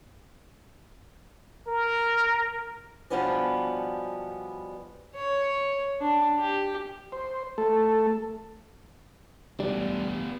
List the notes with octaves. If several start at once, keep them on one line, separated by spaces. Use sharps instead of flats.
A#4
B2 F3 G3 B3 C#4 D4
C#5
D4
G4
C5
A3 A4
E1 A1 D2 G3 B3 D4